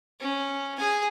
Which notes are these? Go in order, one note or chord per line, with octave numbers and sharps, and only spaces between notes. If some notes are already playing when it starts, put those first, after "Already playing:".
C#4
G#4 G#5